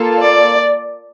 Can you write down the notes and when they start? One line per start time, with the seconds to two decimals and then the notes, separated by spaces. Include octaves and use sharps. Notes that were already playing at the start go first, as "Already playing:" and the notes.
Already playing: A#3 F4 A4
0.21 D5